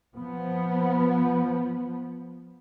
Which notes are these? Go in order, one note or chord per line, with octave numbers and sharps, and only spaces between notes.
F3 B3